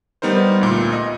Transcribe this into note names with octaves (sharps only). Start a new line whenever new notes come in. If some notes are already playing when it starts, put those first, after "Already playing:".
G3 B3 D#4 A#4 C5
D2 A#2
D#5